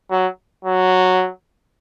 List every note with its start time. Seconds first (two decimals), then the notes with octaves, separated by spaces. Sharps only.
0.11 F#3
0.65 F#3